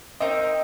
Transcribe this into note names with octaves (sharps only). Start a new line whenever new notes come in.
C4 D#4 A#4 D#5